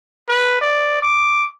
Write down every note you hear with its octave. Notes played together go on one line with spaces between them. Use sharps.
B4
D5
D6